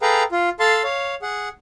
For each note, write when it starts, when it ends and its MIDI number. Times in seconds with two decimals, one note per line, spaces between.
0.02 0.23 68
0.02 0.23 69
0.02 0.23 71
0.02 0.23 77
0.02 0.23 79
0.02 0.23 82
0.32 0.49 65
0.60 0.83 69
0.60 0.83 77
0.60 0.83 81
0.60 0.83 84
0.84 1.15 73
0.84 1.15 77
1.22 1.49 68
1.22 1.49 78